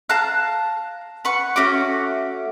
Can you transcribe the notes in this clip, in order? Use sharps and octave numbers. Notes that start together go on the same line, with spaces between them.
F5 A5 A#5 F#6
B4 F#5 C#6
A3 C#4 F#4 D6